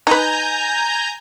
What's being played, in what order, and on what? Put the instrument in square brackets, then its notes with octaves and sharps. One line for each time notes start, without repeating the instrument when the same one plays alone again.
[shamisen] D#4 B4 [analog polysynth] G#5 A#5 G6